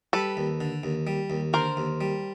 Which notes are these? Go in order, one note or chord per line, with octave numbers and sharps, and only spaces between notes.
G3 A4 B4
D#2
D3
D#2
G3
D#2
D3 A#4 C5
D#2
G3